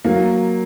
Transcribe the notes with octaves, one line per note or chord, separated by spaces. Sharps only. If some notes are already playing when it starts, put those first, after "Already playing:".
F#3 A#3